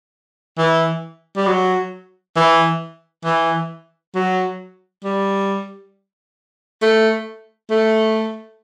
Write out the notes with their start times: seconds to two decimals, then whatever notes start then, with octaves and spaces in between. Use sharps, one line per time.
0.58 E3
1.36 G3
1.47 F#3
2.36 E3
3.25 E3
4.15 F#3
5.04 G3
6.82 A3
7.71 A3